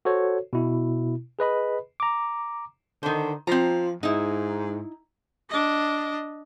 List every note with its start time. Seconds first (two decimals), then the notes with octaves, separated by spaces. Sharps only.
0.05 F#4 A4 C5 C#5
0.53 B2 E4
1.39 G#4 B4 D#5 B5
2.00 A#5 D6
3.03 D3 D#3 C5
3.47 F3 C4 A#5
4.03 G#2 D#4 E4
5.49 D4 D#5